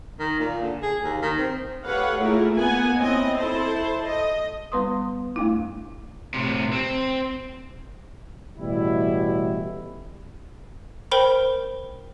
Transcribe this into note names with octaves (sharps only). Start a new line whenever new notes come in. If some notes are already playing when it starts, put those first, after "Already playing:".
D#3
A#2
D3
G#4
D#2
D#3
C4
G4 A4 B4 C#5 F5 F#5
A3 A#3 E4 F4 G#4 A#4
A#3 B3 F#5 G#5
C4 C#4 E4 D#5
E4 A4 C5 A5
D#5
G3 B3 B4 C6 D#6
F2 A3 D4 E4
A2 C3
C4
A1 B2 G3 E4
A#4 C5 G5 B5